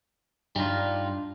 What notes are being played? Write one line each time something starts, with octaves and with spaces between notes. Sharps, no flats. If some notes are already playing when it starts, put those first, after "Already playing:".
G2 G3 D4 D#4 F4